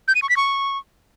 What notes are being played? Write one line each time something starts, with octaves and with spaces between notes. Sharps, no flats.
G6
D#7
C#6
B6
C#6